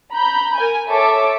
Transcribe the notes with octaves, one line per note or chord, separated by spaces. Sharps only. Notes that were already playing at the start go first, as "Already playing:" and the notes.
A#5 B5 G6
A#4 G#5
A4 C#5 E5 A5 D6